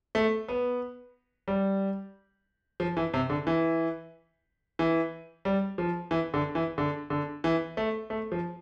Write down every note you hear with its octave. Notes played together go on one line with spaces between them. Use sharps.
A3
B3
G3
F3
E3
C3
D3
E3
E3
G3
F3
E3
D3
E3
D3
D3
E3
A3
A3
F3